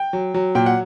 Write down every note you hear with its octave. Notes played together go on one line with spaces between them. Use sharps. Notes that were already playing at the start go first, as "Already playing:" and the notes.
Already playing: G5
F#3
F#3
A#2 G5
F#5